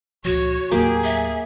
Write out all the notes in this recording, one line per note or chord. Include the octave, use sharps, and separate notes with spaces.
C#2 A#2 F3 F#4 C#5
D#2 A2 F#3 A#3 G4 G#4
E5